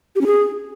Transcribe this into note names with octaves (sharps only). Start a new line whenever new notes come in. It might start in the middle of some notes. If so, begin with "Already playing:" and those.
G4
C#4
G#4